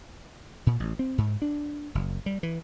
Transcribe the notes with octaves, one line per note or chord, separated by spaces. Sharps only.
A#2
A1
C4
G#2
D4
F#1
G3
E3